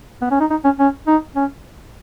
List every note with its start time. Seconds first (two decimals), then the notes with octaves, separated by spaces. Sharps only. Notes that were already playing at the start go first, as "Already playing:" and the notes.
0.22 B3
0.31 C#4
0.40 D#4
0.50 D#4
0.64 C#4
0.79 C#4
1.07 D#4
1.36 C#4